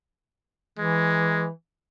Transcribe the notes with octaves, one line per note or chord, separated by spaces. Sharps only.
E3 G#3